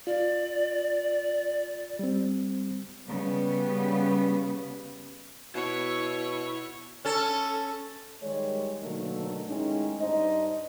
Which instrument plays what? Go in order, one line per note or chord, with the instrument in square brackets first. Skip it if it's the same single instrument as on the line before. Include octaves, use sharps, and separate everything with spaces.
[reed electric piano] F4 [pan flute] D5
[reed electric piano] G3 C4
[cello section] C#3 G3 B3
[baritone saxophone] B2 [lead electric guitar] E4 [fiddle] C#5
[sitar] C#4 A4
[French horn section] D#3 G3 G#3 C#5
B2 D3 D#3 F#3 A3 A#3
A2 D#3 G#3 C#4 D#4
G2 D4 D#4 C5 D#5